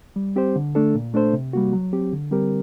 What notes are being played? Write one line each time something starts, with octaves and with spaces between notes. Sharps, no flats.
G3
C4 G4 C5
D3
A3 D4 A4
A#2
A3 D4 A4 C5
C3
G3 A#3 F#4
F#3
C4 G4
D3
G3 C4 G4 A#4